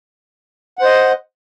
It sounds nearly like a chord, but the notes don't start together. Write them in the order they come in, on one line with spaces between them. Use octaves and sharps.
F#5 C5 D#5